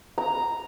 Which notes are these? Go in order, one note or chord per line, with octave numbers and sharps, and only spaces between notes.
A#5